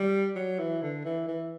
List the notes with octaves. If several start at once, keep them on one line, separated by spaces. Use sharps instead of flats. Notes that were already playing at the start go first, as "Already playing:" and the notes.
Already playing: G3
F#3
E3
D3
E3
E3